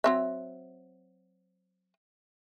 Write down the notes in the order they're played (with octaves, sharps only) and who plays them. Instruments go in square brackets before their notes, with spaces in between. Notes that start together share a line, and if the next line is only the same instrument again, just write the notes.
[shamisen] F#3 C4 E5